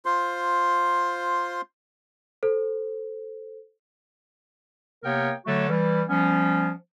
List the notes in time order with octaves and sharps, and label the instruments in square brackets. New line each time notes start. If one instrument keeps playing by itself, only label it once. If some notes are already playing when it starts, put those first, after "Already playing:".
[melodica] F4 C5 C6
[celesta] A4 C5
[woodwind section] C3 A#3 B3 A#4 C#5 G5
D3 F#3 A3 F#4 A4 C#5
E3 G3
F3 G3 B3 C#4